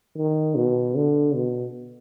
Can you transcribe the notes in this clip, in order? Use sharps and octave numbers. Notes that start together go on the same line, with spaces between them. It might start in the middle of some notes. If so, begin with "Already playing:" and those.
D#3
B2
D3
B2